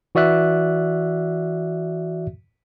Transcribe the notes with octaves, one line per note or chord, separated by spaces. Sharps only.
E3 F#4 D5 E5 F#6